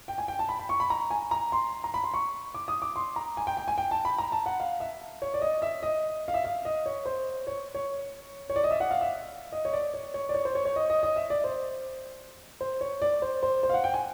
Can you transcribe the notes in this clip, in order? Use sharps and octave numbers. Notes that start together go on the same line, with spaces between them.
G5
G#5
G5
A5
B5
B5
C#6
B5
A#5
G#5
A#5
C6
A#5
B5
C6
C#6
D6
D#6
D6
C6
A#5
G#5
G5
G5
G#5
G5
A5
B5
A#5
A5
F#5
F5
E5
C#5
D5
D#5
E5
D#5
F5
E5
F5
D#5
C#5
C5
C#5
C#5
C#5
D5
D#5
E5
F#5
F5
E5
D#5
C#5
D5
C#5
C#5
D5
C#5
C5
C#5
C#5
D#5
D#5
D#5
E5
D5
C5
C5
C#5
D5
C5
C5
C5
F5
F#5
G5
G#5